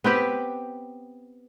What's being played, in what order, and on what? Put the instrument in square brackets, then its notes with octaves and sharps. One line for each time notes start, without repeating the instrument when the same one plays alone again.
[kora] B3 C4 G4 B4